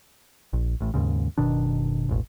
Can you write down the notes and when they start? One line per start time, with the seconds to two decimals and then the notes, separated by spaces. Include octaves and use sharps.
0.53 A#1
0.81 A1 A2
0.94 D#2 G#2 C#3
1.38 F#1 B2 D#3 D4
2.09 E1 A1